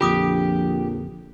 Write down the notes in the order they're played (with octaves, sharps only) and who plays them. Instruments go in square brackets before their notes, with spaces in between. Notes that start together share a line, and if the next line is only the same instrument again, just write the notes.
[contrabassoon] A#1 [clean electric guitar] F2 D3 [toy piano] F4 D6 D#6 [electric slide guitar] G4